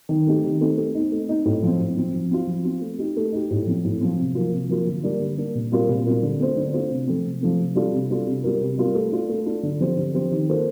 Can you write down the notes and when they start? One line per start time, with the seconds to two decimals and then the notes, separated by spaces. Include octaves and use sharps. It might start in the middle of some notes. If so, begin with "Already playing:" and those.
0.09 D#3
0.27 A3 C4 D#4 G4
0.44 D#3
0.61 A3 C4 D#4 G4
0.77 A3
0.95 C4 D#4
1.12 A3
1.29 C4 D#4
1.45 A2
1.63 F3 C4
1.79 A2
1.96 F3 C4
2.14 F3
2.31 C4 F4
2.47 F3
2.65 C4 F4
2.81 A3
2.98 D#4 G4
3.17 A3
3.32 D#4 G4
3.51 A2
3.67 F3 C4
3.84 A2
4.01 F3 C4
4.18 C3
4.35 F3 A#3 F4
4.52 C3
4.69 F3 A#3 F4
4.87 D3
5.03 G3 A#3 D4
5.20 D3
5.37 G3 A#3 D4
5.55 A#2
5.72 G3 C4 F4 A#4
5.89 A#2
6.06 G3 C4 F4 A#4
6.23 D3
6.39 A3 C4 F4 C5
6.57 D3
6.73 A3 C4 F4 C5
6.90 C3
7.07 F3 A3 C4
7.25 C3
7.41 F3 A3 C4
7.59 C3
7.75 G3 D4 F4 A4
7.93 C3
8.10 G3 D4 F4 A4
8.27 C3
8.44 G3 C4 F4 A#4
8.61 C3
8.78 G3 C4 F4 A#4
8.95 A3
9.12 D4 F4 A4
9.29 A3
9.46 D4 F4 A4
9.63 D3
9.80 F3 C4 G4 C5
9.97 D3
10.14 F3 C4 G4 C5
10.31 D#3
10.49 A#3 F4 A4 C5